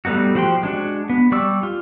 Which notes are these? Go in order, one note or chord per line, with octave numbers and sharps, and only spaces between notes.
G3 A3 B3 D#4 F#4
F3 F#4 G4 G5 C6
G#3 D4 F#4
B3
G3 D5 C#6 D6 E6
F4